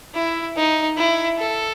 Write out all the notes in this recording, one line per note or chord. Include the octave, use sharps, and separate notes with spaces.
E4
D#4
E4
A4